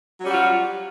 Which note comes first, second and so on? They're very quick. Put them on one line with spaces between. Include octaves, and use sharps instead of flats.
F#3 C#4 G3 F#4 F4